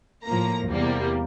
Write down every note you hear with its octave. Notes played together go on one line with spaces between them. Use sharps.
A2 F3 A#3 A#5
E2 C3 G3 A#3